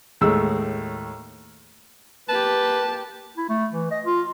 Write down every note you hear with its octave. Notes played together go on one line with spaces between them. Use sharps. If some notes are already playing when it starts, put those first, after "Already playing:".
D#2 A2 G#3 E6
A#3 G4 B4 A5
E4
A3
E3
D#5
F4